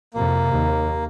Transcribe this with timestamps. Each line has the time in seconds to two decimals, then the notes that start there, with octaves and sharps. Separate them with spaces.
0.14 F2 C3 A#3
0.50 D#2